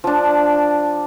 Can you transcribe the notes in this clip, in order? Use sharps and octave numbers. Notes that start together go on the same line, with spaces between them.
F3 D4